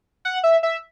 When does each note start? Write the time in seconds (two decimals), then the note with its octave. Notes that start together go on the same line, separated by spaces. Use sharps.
0.25 F#5
0.44 E5
0.63 E5